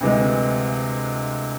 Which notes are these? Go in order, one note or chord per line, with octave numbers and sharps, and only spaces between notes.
D2 C3 E3 G#3